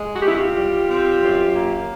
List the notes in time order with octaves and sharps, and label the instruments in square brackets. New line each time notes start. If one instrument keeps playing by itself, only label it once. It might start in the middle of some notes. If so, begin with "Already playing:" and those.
Already playing: [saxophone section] G#3
F#4
G4
C3 E4 F#4
F4 G4
G3
C4
F#2
A#3